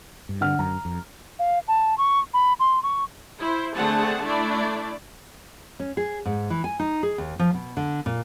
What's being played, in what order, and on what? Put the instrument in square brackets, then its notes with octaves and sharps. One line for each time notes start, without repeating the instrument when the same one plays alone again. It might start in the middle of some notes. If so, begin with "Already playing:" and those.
[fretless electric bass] G2
[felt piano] D3 F#5 F6
[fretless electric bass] F#2 [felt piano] A#5
[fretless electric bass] F2
[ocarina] F5
A5
C#6
B5
C6
C#6
[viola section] E4 C5
D3 A3 C4 G#4 F#5 A5
A3 D4 E4 D5
[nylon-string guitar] C#4
G#4
G#2
E3
G#5
D#4
G#4
D#2
F3
B2
D3
A#2